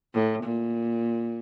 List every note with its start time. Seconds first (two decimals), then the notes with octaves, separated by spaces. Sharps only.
0.14 A2
0.43 A#2